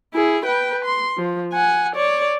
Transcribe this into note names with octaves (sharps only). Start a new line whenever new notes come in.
E4 G#4
B4 G5
C6
F3
F#5 G#5
C#5 D5